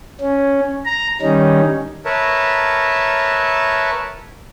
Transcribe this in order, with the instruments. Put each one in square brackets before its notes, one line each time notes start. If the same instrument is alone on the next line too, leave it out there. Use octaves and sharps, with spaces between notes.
[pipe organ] C#4
A#5
D#3 G3 C#4 D#4
[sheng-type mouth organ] A#4 B4 C#5 E5 A5